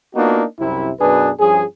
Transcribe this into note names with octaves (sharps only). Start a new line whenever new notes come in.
A#3 B3 D4 D#4 F4 F#4
C2 F#2 C3 E4
F#2 B2 D4 G#4 B4
G2 F3 C#4 G#4